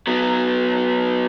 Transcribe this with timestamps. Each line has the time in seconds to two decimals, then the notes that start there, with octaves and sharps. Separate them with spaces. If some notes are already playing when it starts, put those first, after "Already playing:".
0.07 F#3 B3